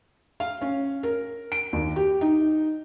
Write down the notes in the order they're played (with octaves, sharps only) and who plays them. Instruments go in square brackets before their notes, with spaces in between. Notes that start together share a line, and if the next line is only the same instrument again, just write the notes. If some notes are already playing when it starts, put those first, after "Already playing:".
[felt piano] F5
C#4
A#4
D7
D#2
G4
D#4